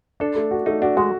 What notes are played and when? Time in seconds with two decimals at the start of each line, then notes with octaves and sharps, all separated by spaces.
0.20 D4 A4
0.36 A3
0.51 F#4
0.66 A3 D#4
0.82 D4 F#4
0.97 G#3 F#4